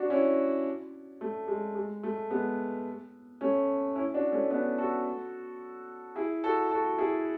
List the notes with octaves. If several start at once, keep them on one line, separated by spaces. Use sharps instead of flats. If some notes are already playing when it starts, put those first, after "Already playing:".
Already playing: D4 F#4
C#4 E4
A3
G#3
G#3
A3
G#3 B3
A3 C#4
C#4 E4
D4 F#4
A3 C#4
B3 D4
F#4 A4
E4 G#4
F#4 A4
F#4 A4
E4 G#4